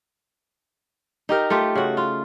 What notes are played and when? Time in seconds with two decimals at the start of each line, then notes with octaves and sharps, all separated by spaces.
1.29 D#4 G4 A#4
1.50 A3 F4 G4
1.75 C#3 F#4
1.97 F4